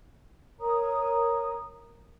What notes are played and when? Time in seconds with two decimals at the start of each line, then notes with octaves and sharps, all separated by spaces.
0.60 A#4 C#5 A#5 D#6